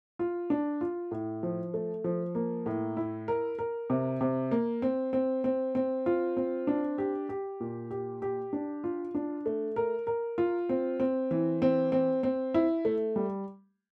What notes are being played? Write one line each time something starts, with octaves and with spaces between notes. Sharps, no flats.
F4
D4
F4
A2
F3
A3
F3
A#3
A2
E4
A#4
A#4
C3
C3
A#3
C4
C4
C4
C4
F4
C4
D4
G4
G4
A#2
G4
G4
D4
F4
D4
A3
A#4
A#4
F4
C4
C4
E3
C4
C4
C4
E4
A3
G3